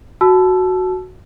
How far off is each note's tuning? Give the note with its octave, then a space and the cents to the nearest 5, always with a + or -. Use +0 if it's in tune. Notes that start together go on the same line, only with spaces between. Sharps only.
F#4 +0 A5 -15 E6 +20